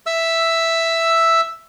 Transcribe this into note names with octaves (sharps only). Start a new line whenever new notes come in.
E5 E6